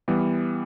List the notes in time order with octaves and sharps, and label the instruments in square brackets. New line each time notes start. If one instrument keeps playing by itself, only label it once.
[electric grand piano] E3 G3 B3